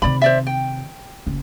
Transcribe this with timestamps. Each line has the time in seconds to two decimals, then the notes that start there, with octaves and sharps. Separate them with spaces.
0.02 C3 D#3 D5 B5
0.22 C5 D5 E5
0.47 G5
1.27 F#1